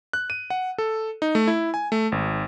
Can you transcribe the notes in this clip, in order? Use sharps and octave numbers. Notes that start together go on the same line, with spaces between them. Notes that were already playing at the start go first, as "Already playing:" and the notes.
F#6
D#7
F#5
A4
D#4
A3
E4
G#5
A3
G#1